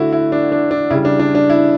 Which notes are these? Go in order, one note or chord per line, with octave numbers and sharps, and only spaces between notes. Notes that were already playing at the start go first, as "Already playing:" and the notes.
Already playing: D3 A3 E4 F#4
E4
D4
D4
D4
C#3 G3 E4
D4
D4
D4
E4